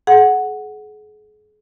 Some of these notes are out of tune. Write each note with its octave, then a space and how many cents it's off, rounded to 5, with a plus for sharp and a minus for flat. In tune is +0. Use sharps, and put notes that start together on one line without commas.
G#4 +35 F#5 +0